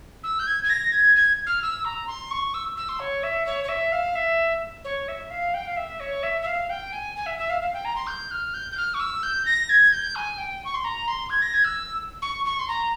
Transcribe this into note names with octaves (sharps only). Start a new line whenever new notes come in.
E6
G6
G#6
G#6
A#6
G#6
G#6
F6
E6
A#5
C6
C#6
E6
E6
C6
C#5
E5
C#5
C#5
E5
F5
E5
C#5
E5
F5
G5
F5
E5
C#5
E5
E5
F5
G5
G#5
G#5
E5
E5
F5
F5
G5
A#5
C6
G6
F6
G6
G6
F6
C#6
E6
G6
A#6
G#6
G6
G#5
G5
C#6
C6
A#5
C6
G#6
A#6
G#6
E6
C#6
C#6
C6
A#5